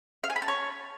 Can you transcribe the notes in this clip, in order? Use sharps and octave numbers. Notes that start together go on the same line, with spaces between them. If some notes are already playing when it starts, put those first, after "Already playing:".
F5
G#5
B5
A5
C#5